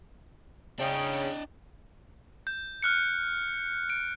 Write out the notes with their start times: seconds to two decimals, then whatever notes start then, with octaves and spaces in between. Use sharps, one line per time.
0.79 C#3 D4 D#5 G5
2.47 G6
2.83 F6 F#6 C#7
3.90 D7